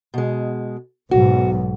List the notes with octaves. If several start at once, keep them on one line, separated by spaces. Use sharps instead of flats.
B2 G#3
B1 G#2 F#4